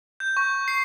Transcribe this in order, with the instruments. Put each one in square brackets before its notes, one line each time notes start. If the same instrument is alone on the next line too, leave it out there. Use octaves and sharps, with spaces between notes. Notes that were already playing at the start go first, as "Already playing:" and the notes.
[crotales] G6
C#6
C7